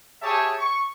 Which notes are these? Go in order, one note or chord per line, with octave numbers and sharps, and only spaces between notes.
G4 G#4 C#5 E5 A5
C#6